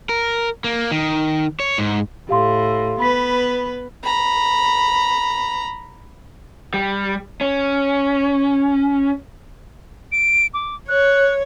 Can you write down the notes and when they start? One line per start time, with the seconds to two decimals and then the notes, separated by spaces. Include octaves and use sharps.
0.09 A#4
0.64 A#3
0.91 D#3
1.60 C#5
1.78 G#2
2.29 A2 G4 F5 C6
3.00 B3 B4 B5 B6
4.03 A#5 B5
6.74 G3
7.41 C#4
10.12 D7
10.54 D6
10.88 C#5 F#6